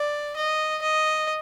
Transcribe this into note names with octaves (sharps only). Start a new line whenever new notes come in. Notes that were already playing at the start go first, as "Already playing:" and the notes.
Already playing: D5
D#5
D#5